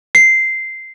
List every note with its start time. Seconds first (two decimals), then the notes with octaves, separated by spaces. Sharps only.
0.15 C7